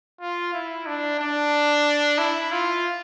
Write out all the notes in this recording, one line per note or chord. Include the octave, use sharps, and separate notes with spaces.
F4
E4
D4
D4
E4
F4